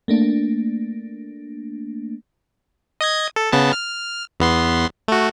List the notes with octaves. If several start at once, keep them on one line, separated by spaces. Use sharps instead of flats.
A3 A#3 D4
D#5 D#6 G#6
A4
C#3 B3 A5
F6
E2 B3 C6
A3 F#4